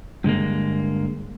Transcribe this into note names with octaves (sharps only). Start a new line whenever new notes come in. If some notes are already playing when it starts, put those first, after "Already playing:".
G2 D3 G#3 A#3